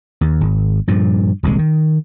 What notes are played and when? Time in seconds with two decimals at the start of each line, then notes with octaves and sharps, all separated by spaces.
0.21 D#2
0.41 G#1
0.88 G2 A#2 F3
1.43 D#1 C2 A#2 G#3
1.59 D#3